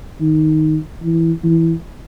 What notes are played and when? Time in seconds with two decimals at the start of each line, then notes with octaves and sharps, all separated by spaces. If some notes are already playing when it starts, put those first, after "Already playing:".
0.21 D#3
1.03 E3
1.44 E3